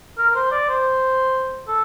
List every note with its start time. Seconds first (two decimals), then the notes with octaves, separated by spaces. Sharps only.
0.18 A#4
0.30 A#4
0.35 C5
0.51 D5
0.69 C5
1.68 A4